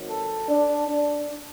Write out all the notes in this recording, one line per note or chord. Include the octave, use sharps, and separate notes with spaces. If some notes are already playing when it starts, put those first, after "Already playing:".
Already playing: G#1 G#2 F#3
A4
D4
D4